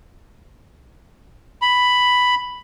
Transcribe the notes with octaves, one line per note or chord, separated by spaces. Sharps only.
B5